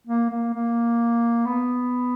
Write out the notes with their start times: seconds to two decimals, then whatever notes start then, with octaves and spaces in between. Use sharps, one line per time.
0.07 A#3
0.30 A#3
0.53 A#3
1.46 B3